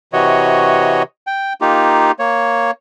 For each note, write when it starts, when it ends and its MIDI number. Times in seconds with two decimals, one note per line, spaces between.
0.13 1.03 48
0.13 1.03 52
0.13 1.03 66
0.13 1.03 73
0.13 1.03 75
1.27 1.53 79
1.61 2.12 58
1.61 2.12 63
1.61 2.12 65
1.61 2.12 67
2.19 2.71 58
2.19 2.71 73